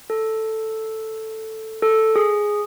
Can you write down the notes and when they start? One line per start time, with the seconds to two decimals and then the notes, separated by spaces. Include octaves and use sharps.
0.10 A4
1.82 A4
2.16 G#4